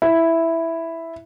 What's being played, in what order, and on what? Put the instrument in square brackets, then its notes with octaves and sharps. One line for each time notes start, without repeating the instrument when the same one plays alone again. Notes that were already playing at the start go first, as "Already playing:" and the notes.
[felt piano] E4